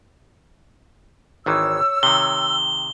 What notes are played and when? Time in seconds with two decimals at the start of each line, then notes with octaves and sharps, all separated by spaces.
1.46 G#1 D#3 E3 C#5 E6
2.03 C3 D#3 G7